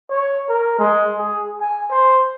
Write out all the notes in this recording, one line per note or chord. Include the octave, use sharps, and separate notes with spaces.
C#5
A#4
G#3
G#4
G#5
C5